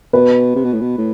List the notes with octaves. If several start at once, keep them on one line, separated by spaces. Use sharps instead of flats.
B2 B4
C3
B2
A2
B2
A2